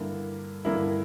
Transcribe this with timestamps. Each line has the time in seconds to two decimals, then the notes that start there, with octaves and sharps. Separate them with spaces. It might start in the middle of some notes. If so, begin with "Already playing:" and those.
Already playing: G2 D3 A#3 E4 A#4
0.65 G2 D3 A#3 E4 A#4